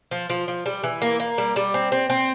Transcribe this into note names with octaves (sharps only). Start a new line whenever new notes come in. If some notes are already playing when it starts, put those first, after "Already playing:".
F3
F3
F3
G3
E3
A#3
A#3
G3
G3
C4
C4
C4